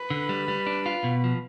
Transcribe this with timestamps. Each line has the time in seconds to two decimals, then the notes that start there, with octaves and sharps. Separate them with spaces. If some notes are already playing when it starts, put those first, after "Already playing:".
Already playing: B4
0.10 D3
0.29 G3
0.48 G3
0.67 D4
0.86 F4
1.04 B2
1.24 F3